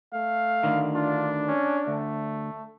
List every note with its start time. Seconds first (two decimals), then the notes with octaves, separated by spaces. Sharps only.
0.13 A3 F5
0.63 D2 D3 D#3
0.95 D4 F4
1.48 C#4
1.87 D2 A3